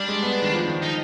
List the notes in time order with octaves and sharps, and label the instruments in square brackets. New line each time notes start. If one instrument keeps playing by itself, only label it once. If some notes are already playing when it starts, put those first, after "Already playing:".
Already playing: [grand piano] G3 [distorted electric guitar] D4
[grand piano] G#3
B3
D#3
F3
D#3
[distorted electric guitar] D#4